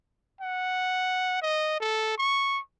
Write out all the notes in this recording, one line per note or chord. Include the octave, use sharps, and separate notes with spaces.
F#5
D#5
A4
C#6